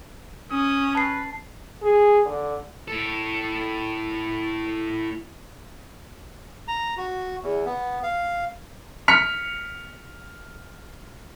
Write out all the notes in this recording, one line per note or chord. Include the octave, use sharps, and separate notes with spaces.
C#4 D#6
B4 A5 C7
G#4
D3
A2 A4
A#5
F#4
E2
B3
F5
F6 B6 C#7 F7